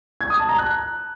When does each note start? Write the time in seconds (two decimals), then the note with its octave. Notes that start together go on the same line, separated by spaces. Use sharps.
0.21 G#6
0.30 D#6
0.39 A5
0.49 A#5
0.58 F#6